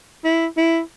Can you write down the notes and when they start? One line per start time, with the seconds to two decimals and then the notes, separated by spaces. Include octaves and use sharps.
0.24 E4
0.57 E4